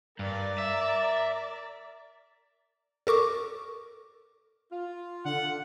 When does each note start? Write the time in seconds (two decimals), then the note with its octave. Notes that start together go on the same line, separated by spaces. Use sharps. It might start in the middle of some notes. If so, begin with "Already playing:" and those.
0.19 G2 A#4 D5
0.58 E5
3.07 A4 A#4 C#6 D6
4.72 F4
5.25 D3 F#5